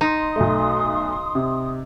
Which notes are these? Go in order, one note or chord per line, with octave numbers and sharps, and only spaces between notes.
D#4 C6 D#6
B1 A3
C3